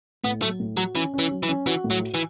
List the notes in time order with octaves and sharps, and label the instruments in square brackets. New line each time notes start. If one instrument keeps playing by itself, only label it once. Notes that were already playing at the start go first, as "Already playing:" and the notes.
[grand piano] A2 [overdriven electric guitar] B3
[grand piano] F#3 [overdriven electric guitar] A3
[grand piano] A2
[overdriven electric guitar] F#3 [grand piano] F#4
[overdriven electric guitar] E3 [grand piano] C#4
[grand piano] C#4
[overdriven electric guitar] E3
[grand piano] F#3
[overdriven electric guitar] E3
[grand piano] C#4
[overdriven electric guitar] E3 [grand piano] F#4
[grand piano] A2
[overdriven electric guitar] F#3
[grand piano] F#4
[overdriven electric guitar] E3